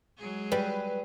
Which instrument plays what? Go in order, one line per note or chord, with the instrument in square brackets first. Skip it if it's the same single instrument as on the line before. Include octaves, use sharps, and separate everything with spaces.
[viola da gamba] F#3 G#3 G#4
[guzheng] G3 [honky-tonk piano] B4